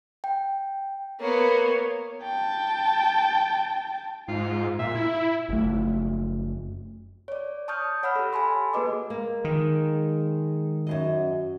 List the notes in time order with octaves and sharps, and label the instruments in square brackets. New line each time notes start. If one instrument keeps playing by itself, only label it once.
[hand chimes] G5
[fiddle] A#3 B3 [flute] C#5
[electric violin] G5 A5
[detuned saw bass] G#2 [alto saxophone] F4
[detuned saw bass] A#2 [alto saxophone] E5
[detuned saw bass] E4
[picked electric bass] F#1 A3
[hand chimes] C#5 D5
A5 C#6 D#6 F6 G6
C#5 F#5 B5 E6 F6
G4 A4
G#5 A5 B5 C6
A#3 F#4 G#4 B4 D#5 D6
[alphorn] G#3 [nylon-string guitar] A#3
[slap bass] D#3
[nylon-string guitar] F#2 C#3 D#5 [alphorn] F#4